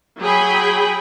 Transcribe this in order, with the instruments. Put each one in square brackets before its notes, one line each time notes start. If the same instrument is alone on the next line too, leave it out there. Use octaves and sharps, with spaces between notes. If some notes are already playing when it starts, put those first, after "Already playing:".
[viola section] F#3 G#4 G5 G#5 B5